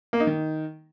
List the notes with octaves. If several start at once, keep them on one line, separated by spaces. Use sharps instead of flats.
A#3
D#4
D#3